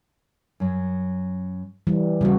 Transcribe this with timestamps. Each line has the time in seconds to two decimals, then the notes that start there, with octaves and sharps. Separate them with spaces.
0.60 F#2 F#3
1.87 E3 G3
2.21 E2 A#2 C#3 G3 F#4